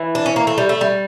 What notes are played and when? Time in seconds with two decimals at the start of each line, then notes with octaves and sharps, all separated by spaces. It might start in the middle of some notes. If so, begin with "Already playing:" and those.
Already playing: E3
0.15 D4
0.26 C#4
0.36 A#3
0.47 A3
0.58 G3
0.69 A3
0.81 G3